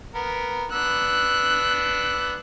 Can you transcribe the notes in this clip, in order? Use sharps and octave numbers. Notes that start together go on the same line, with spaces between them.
B3 A#4
B3 D4 E6 F#6